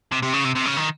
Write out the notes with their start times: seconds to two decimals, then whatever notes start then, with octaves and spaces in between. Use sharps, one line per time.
0.12 C3
0.23 C3
0.34 C#3
0.45 C3
0.55 C3
0.66 C#3
0.77 D#3